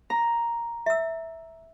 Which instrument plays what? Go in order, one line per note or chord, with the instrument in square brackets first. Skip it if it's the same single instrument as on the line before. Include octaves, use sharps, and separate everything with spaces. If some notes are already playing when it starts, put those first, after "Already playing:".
[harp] A#5
[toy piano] E5 E6